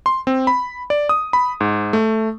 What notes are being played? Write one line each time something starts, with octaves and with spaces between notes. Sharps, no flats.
C6
C4
B5
D5
D#6
B5
G#2
A3